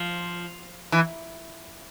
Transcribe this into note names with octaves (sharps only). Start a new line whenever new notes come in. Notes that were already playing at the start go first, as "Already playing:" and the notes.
Already playing: F3
E3